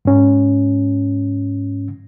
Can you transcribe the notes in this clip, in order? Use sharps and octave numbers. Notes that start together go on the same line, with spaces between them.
G#2 C#4